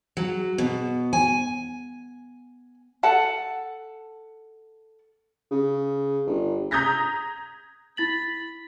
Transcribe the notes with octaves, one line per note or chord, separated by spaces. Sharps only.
F#3
B2
G#5
A4 F#5 A5
C#3
G1
A#5 D#6 G6 G#6 A#6 B6
E4 B5 A6 F#7